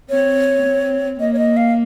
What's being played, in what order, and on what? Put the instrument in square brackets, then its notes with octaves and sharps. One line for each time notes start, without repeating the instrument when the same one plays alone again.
[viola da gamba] C4 [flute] C#5
[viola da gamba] C4
[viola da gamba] A#3 [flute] D#5
[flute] C#5
D#5
F5